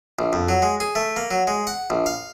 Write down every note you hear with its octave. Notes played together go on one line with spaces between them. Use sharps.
A#1
F2
F#3
G#3
G#4
A3
A#3
F#3
G#3
F#5
A#1
F5